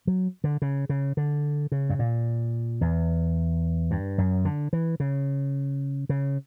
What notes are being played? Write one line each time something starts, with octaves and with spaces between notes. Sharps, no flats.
F#3
D3
C#3
C#3
D3
C#3
G2
A#2
E2
G2
F#2
D3
E3
C#3
C#3